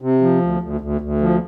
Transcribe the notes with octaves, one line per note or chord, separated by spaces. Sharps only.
C3
F3
D2
D2
D2
D2
F3